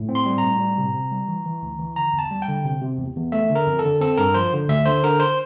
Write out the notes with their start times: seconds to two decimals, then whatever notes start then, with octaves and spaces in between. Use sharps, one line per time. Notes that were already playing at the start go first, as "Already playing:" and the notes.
Already playing: A2
0.09 C4
0.15 C6
0.26 G3
0.38 A#5
0.43 A2
0.60 G3
0.78 C3
0.94 C3
1.12 G3
1.28 E3
1.46 E3
1.62 D2
1.79 E3
1.96 D3 A#5
2.13 E2
2.19 A5
2.31 G3
2.42 G5
2.48 D3
2.65 C3
2.81 C3
2.99 E2
3.16 E2
3.32 A3 E5
3.50 D3
3.55 A#4
3.67 F2
3.79 A4
3.85 D3
4.01 C4 A4
4.17 G2 A#4
4.34 F3 C5
4.53 D3
4.68 D2 E5
4.86 D3 C5
5.04 D3 A#4
5.20 C5